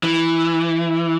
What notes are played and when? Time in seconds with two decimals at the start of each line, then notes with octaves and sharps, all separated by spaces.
0.03 E3